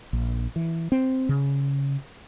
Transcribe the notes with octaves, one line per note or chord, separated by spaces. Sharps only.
A#1
E3
C4
C#3